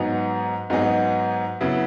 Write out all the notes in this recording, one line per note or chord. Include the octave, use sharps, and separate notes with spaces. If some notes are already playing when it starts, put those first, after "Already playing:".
Already playing: G#2 F#3 B3 D#4 G#4
G#2 F#3 B3 D#4 G#4
C#3 F#3 B3 E4